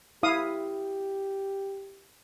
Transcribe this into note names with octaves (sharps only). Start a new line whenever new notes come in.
E4 G4 F5 D#6